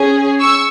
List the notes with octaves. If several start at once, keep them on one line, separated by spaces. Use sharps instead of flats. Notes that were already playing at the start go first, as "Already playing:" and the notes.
Already playing: C#4 G#4
C#6 E6